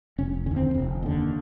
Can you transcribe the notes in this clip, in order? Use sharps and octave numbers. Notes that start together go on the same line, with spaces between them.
F1 C#4
D#2 D3 C#4
C4
F1
D#2 D3